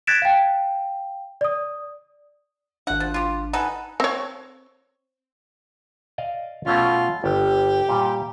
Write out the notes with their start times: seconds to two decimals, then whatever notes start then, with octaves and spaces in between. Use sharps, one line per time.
0.07 F#6 G#6 A6 B6 D7 E7
0.22 F5 G5
1.41 D5 D#6
2.87 G#1 D4 F#5
3.00 F3
3.14 F4 G4
3.53 D#4 A4 B4 F#5 G#5
4.00 C4 C#5
6.18 D5 D#5 F5
6.66 B2 A3 C#4 F4
7.24 G1 G4
7.89 A#2 G3